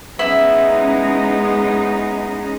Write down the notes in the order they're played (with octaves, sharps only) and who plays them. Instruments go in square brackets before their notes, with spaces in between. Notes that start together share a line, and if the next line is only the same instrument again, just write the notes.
[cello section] G#3 C#4 D#4 [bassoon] B3 [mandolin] E4